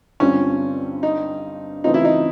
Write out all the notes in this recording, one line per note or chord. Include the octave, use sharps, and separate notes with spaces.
G2 D3 G3 C4 C#4 F4
D#4
C#3 E3 A3 C4 D#4 F4
E4
D#4